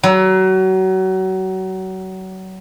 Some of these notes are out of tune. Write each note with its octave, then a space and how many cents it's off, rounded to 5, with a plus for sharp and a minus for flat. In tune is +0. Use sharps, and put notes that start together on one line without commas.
F#3 +30